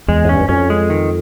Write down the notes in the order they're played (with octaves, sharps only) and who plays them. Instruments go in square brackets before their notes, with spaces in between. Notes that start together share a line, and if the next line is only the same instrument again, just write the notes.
[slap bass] E2 [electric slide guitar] G#3
[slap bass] G#2
[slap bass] G2 [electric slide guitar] C#4
[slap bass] F#2
[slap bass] F2 [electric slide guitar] C#4
[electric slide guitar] G#3
D#3